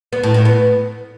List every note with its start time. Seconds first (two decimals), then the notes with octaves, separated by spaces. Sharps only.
0.13 B3
0.23 A2
0.34 A2
0.45 B3